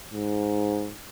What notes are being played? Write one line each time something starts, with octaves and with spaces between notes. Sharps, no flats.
G#2